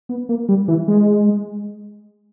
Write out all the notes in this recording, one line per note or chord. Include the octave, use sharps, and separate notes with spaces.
B3
A#3
G3
E3
G#3